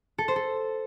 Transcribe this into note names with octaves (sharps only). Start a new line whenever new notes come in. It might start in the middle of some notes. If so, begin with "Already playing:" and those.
A4
C5
A4